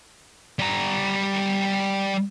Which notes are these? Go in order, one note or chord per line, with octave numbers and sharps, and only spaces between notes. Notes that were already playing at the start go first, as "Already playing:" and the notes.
G3 A#5